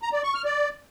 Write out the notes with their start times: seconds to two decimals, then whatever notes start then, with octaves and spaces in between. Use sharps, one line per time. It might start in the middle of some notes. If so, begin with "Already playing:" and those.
0.02 A#5
0.13 D5
0.24 C#6
0.34 F6
0.45 D5